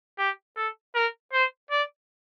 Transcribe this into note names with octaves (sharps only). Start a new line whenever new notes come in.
G4
A4
A#4
C5
D5